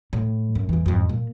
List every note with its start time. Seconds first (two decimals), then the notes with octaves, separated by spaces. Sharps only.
0.13 A2
0.55 F#2
0.69 F2 E3
0.86 F2 G#2
1.09 A#2